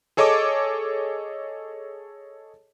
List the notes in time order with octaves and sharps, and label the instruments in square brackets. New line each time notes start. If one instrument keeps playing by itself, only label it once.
[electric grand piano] G#4 A4 C#5 D#5 A5 D6